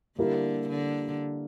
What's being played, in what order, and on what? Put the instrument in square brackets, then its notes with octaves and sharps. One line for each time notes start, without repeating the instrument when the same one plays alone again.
[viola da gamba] D3 [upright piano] G3 A#3 E4 G4 A#4
[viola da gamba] D3